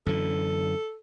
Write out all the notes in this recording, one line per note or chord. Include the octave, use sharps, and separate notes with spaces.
F#2 D3 E3 A4